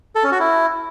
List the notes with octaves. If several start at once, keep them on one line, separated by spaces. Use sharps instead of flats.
A4
C#4
F#4
E4